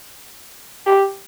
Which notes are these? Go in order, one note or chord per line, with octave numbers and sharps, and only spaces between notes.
G4